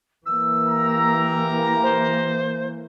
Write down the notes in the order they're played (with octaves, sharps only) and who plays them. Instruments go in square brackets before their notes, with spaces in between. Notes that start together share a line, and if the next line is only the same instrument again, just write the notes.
[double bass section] E3 A#3 [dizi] E6
[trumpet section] G4 A#4 A#5
[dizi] C5